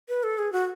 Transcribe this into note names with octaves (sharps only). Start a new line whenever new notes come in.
B4
A4
G#4
F#4